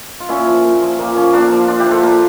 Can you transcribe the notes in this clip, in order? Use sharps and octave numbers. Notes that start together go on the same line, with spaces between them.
F4
A#2 C#4 E4
F3
A#2
F3
A#2 A#3
F3 C#4
A#2 A#3 D4
F3
A#2 D4 F4
E4 G4
F3
F4 A4
A#2 A#3